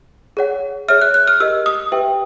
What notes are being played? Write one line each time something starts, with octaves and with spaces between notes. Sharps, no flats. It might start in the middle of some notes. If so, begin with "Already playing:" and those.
G#4 C#5 F#5
G#4 C#5 E5 F6
F#6
F#6
F6
G4 A#4 D#5 E6
D#6
G4 B4 E5 G5